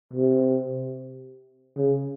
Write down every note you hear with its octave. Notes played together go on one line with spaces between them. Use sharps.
C3
C#3